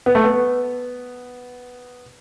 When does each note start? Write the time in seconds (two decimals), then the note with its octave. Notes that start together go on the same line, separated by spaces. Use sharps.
0.06 B3
0.15 A3
0.24 B3